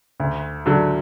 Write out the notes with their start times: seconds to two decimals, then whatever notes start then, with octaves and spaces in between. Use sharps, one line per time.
0.20 D2
0.66 D3 F#3